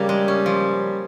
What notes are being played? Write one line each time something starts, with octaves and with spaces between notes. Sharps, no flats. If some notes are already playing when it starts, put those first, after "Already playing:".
Already playing: C#3 G3 A#3
G#3
C#4
F3